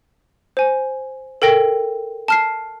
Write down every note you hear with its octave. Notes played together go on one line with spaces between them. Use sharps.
C5 G#5
A4 A#4 G5 A#6
A5 F6 C7